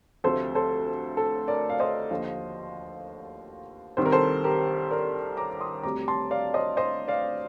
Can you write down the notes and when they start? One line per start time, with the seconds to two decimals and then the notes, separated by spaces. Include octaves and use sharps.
0.24 D2 C3 F3 A3 A4 C5
0.55 A4 C5
1.17 A4
1.48 A#4 D5
1.70 F5
1.80 C5 D#5
2.11 D#2 D3 F3
3.97 C2 C3 D#3 G3 C5
4.06 A#4
4.12 A4 C5
4.44 G4 A#4
4.91 A#4 D5
5.37 A#5 D6
5.61 C6 D#6
5.83 D2 C3 G3 A#5 D6
6.08 A5 C6
6.31 D5 F5
6.54 C5 D#5
6.77 C5 D#5
7.08 D5 F5